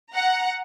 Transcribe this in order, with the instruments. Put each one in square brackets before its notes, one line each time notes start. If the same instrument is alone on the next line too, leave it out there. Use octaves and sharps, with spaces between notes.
[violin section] F#5 A#5